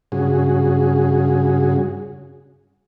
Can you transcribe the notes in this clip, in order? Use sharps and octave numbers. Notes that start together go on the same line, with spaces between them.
G2 C#3 F#4 G#4